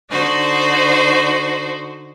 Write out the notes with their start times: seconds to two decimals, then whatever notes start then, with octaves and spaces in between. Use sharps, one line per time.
0.10 D3 D#4 F#4 C5